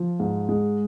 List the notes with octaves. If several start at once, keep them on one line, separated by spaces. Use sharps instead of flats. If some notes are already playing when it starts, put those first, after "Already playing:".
Already playing: F3
G#2
G#3